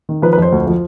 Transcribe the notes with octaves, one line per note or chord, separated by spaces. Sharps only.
D#3
F3 B4
B4
F2 C5
D2
F3